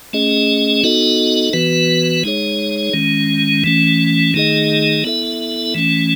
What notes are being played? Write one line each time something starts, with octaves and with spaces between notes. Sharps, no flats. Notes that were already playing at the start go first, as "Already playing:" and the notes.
A3 C#4 G#4 D#5
B3 D#4 F#4 A4 D#5
E3 B3 F#4 B4
G#3 D#4 G#4 C#5
D#3 G#3 C#4
E3 A3 C#4
D#3 A3 D#4 G#4 D#5
B3 E4 A4 E5
E3 A3 C#4